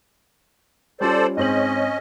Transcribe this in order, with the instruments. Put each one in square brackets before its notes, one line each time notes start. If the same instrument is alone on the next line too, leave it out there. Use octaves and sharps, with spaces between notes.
[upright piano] G3 C#4 F4 [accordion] A4 C5 D5
[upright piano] G#2 C4 F#7 [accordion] C#4 D#5